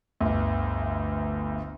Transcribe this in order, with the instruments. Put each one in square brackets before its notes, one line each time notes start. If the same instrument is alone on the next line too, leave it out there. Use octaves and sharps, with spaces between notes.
[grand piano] G1 D2